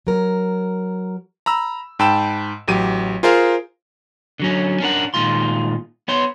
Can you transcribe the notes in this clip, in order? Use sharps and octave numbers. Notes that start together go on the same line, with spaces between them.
F#3 A#4
A#5 B5 E6
G#2 G5 A5 B5 E6 E7
A1 F#3 G4 D#7
F4 G#4 A#4 C5 F5
D3 F#3 C#4
C#4 D4 A4 A#4 F#5
A#2 D#3 G#3 F4 C6
B3 C#5 C6